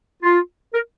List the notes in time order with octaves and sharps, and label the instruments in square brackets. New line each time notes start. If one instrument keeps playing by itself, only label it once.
[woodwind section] F4
A#4